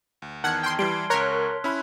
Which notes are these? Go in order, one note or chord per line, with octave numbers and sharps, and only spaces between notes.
D2
E2 D#3 F#5 A5 F6 G#6
G5 C6
E3 G3 C6 C7 D7 G7
C#2 A#4 C#5 C6 F#6 B6
C#4 E4 B5 E6 F#6